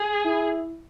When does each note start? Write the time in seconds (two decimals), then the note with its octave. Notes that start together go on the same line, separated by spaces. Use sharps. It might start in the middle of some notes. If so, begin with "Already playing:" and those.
Already playing: G#4
0.24 E4